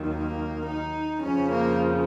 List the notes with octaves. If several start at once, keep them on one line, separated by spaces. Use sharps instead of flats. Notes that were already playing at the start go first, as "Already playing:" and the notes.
Already playing: D#2 D#3 F#3
A#3
D#4
F2 C#3 F3 C#4
A#3